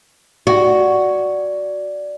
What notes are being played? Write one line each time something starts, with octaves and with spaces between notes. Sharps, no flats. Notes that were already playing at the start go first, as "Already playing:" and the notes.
F#4 D5